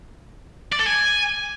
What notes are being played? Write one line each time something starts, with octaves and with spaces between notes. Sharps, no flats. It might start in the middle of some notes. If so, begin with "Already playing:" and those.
D5
A4
G#5